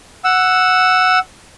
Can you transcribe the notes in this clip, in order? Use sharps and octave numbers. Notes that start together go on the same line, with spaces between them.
F#5 E6